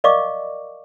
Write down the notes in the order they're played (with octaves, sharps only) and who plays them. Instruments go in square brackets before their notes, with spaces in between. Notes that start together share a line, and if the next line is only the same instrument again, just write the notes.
[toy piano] A#4 D5 D#5 F5 C#6 D6